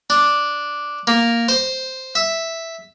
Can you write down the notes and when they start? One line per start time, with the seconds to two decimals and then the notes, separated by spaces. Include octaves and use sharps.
0.10 D4
1.07 A#3
1.49 C5
2.15 E5